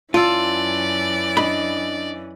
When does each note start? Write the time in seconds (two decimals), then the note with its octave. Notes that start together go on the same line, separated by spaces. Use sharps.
0.14 F#2 E3 C#4 F4 D5 A5 E6
1.37 D4 D#5 B5